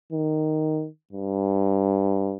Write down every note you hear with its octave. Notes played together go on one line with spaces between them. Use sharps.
D#3
G2